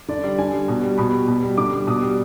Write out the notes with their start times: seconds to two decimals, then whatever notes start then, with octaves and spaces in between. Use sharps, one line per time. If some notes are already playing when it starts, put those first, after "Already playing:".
0.09 D3 D5
0.24 G3 D5
0.39 D3 G#5
0.53 G3
0.68 B2
0.83 G3
0.98 B2 B5
1.13 G3
1.27 B2
1.43 G3
1.57 D3 D6
1.72 G3
1.87 B2 D#6
2.02 G3